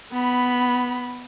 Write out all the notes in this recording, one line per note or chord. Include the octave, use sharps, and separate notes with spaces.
B3 B5